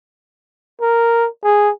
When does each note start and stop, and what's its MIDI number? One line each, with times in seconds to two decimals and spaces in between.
0.81 1.28 70
1.44 1.71 68